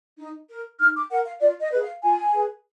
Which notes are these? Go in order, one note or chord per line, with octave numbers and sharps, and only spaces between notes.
D#4
A#4
D#4 F6
D6
A#4 F#5
F5
F4 D5
D#5
G#4 B4
F5
F4 G#5
G#4 B4